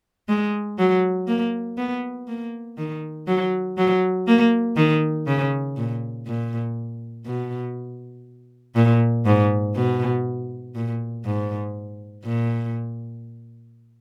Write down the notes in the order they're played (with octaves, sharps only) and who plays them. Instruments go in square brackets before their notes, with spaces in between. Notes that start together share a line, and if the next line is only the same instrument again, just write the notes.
[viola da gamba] G#3
F#3
A#3
B3
A#3
D#3
F#3
F#3
A#3
D#3
C#3
A#2
A#2
B2
A#2
G#2
B2
A#2
G#2
A#2